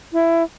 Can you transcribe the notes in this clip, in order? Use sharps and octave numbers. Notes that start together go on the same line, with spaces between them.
E4